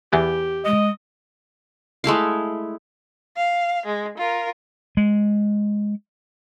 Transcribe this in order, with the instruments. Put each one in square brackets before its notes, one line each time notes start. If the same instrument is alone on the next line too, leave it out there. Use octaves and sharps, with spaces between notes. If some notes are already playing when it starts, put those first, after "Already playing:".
[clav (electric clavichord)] E2 E3 B3 [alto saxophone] G4
[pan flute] G#3 [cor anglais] D#5
[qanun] G#3 A3 E4 F5
[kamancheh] F5
G#3
F4 A#4
[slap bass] G#3